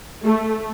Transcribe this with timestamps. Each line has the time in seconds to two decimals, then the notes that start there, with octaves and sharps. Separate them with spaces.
0.24 A3